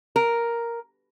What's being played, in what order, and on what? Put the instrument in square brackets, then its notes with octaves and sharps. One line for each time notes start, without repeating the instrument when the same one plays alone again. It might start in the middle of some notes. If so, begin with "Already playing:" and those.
[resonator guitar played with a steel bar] A#4